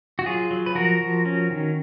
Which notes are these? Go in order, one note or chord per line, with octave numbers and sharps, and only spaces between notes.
F#4
F#3 F4 G#4
F#3
B4
F3 F#4 A#4
F3
C#4
D#3